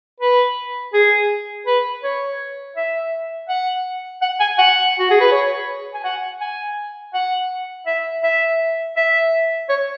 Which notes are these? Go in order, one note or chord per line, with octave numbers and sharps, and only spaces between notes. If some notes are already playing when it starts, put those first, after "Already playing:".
B4
G#4
B4
C#5
E5
F#5
F#5
G#5
F#5
F#4
G#4
B4
C#5
G#5
F#5
G#5
F#5
E5
E5
E5
C#5